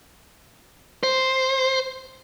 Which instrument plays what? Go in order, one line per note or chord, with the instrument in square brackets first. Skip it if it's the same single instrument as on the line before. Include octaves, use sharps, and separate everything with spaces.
[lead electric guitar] C5